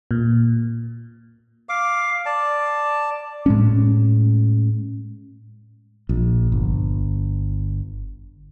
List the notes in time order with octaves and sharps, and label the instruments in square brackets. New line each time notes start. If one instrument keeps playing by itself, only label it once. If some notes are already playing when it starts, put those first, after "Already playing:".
[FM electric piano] A#2
[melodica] F5 D6
D5 A5
[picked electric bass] A2 G#3 C#4
[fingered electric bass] A#1
G1